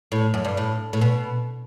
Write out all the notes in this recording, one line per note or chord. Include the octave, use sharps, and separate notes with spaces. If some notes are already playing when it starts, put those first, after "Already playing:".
A2
F#2
G2
A2
A2
B2